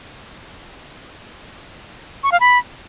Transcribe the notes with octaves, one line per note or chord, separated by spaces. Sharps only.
C#6
F5
B5